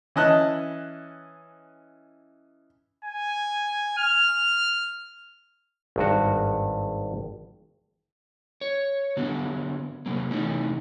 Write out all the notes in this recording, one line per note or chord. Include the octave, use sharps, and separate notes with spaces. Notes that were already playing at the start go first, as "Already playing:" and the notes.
E3 C#4 D#5 A5 F#6
G#5
F6
G#1 G2 F#4
C#5
D3 F#3 B3 D4
C3 F#3 A#3
C3 E3 A3 C#4 D#4